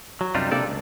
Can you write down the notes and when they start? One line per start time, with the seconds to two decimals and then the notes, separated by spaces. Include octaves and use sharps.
0.21 F#3
0.35 F#2 C3 G3 D4 D#4 F4
0.51 C3 A#3 D4 G4 A4 D5
0.65 C#2